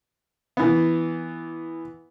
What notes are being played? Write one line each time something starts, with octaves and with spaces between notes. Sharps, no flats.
E3 B3